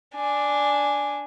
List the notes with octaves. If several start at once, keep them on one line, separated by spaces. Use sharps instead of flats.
D4 G#5